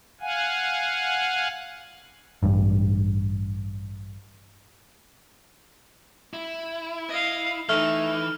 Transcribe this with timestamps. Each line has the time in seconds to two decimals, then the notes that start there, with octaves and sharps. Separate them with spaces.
0.21 F5 F#5 G#5
2.43 A1 G2
6.33 E4
7.09 D#5 F5
7.69 E3 A3 D#4 F6